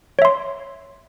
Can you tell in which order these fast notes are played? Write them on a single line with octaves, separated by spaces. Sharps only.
C#5 E5 C6